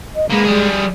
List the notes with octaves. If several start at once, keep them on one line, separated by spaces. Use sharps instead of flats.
D#5
G#3 A#3 B3
G3 G#4